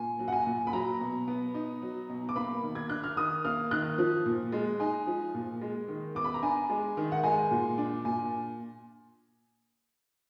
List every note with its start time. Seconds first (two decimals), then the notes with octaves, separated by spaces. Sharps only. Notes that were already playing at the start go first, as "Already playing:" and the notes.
Already playing: A#2 G#5
0.19 F#3
0.28 F#5
0.33 G#5
0.46 A#2
0.67 B5
0.73 F#3 A#5
1.00 B2
1.28 B3
1.54 D#4
1.82 F#3
2.09 B2
2.29 D6
2.36 A#3 B5
2.63 D#3
2.75 G#6
2.89 D4 F#6
3.04 F6
3.17 D#3 D#6
3.45 A#3 F6
3.71 D#3 F#6
3.98 F3
4.26 A#2
4.52 G#3
4.80 D#4 G#5
5.07 F3
5.34 A#2
5.61 G#3
5.88 D#3
6.15 B3 D6
6.24 B5
6.34 A#5
6.42 D4 G#5
6.70 G#3
6.97 D#3
7.12 F#5
7.24 G#3 G#5
7.51 A#2
7.78 D4
8.05 A#2 G#5